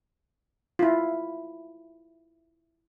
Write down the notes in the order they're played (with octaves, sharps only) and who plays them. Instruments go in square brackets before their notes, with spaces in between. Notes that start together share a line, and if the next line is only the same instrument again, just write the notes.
[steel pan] E4 F4